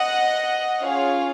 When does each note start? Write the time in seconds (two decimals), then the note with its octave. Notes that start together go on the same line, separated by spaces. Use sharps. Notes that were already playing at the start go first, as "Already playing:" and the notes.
Already playing: D#5 F#5
0.82 C#4 F4 G#4 C#5 F5